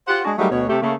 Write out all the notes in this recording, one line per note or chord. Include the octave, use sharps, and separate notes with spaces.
F4 G4 C5 F#5
G#3 D4 F#4 G#4
F#3 G3 A3 A#3 D#4 G#4
D2 B2 C#5
C3 A3 G4
C#3 A3 A#3